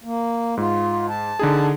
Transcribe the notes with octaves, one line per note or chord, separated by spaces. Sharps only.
A#3
G#2 F4
A5
D3 D#4 G#4